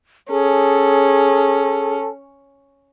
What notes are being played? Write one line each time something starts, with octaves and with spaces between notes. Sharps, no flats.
C#4 G#4 A4